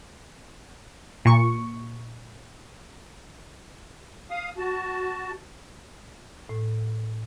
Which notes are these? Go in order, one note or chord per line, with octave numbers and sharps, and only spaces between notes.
A#2 C#6
F5 D#6
F#4 A5
A2